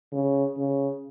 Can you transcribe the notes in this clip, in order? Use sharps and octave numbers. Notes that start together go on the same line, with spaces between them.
C#3
C#3